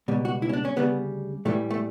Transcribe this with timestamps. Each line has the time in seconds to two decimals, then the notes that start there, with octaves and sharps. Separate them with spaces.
0.08 C#2 B2 G3
0.25 F#4
0.42 E4
0.49 C#4
0.53 D4
0.65 C#4
0.76 D2 C#3 G3 B3
1.45 A2 E3 G3 A3
1.70 A3